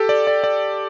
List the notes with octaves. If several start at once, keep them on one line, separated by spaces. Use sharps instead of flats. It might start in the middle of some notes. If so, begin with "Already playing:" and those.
Already playing: G4 A4
D5
D5
D5